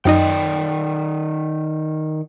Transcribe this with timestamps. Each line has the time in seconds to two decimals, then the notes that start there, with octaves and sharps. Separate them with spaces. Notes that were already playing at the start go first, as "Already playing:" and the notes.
0.05 F#2 D#3 D#4 D5 D#5 G5